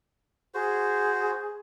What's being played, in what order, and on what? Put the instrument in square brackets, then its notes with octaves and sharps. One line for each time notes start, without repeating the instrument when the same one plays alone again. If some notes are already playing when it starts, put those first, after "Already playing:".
[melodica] F#4 C5 [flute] G#4